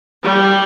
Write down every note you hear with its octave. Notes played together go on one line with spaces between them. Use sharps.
G3